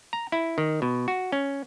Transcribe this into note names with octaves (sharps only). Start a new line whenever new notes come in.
A#5
E4
D#3
B2
F#4
C#4